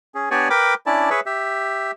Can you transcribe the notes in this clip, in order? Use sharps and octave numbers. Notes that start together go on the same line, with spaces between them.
C#4 G#4
B3 D4 G4 C#5 D5 G#5
A#4 B4 G5 B5 D6
C#4 D4 E4 D5 A5
G#4 B4 C#5 E5
G4 E5